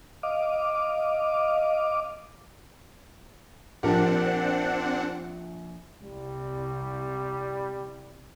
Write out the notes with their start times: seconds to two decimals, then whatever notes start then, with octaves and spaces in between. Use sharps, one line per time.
0.23 D#5 F5 D6
3.83 A#1 C4 D4 G4 A#4 F#5 A5
6.04 C2 G3